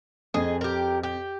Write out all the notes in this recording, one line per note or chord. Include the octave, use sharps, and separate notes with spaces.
F2 G#4 D#5
G4 A#4
G4